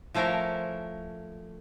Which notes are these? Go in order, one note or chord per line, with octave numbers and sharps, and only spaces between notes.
F3 A3 C#4 E4 A#4